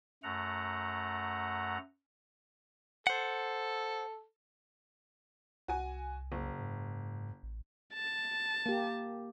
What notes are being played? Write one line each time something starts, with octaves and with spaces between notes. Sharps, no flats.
F#2 A3 F#5 A#5
A4 C5 F#5
C2 F#4 G#5
F#1
G#2
A1
A5
A#3 G4